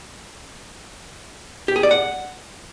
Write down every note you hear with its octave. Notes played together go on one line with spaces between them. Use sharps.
G4
G#4
D5
F#5